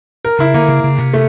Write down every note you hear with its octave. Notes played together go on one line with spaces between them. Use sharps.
A#4
C#3 E4
D3 A#3
C#3
C#3
C3
A3